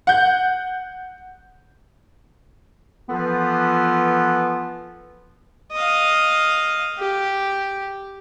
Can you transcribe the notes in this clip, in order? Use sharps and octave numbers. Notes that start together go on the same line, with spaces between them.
F#5 G6
E3 F3 B3 F4 A4 B4
D#5 F5
G4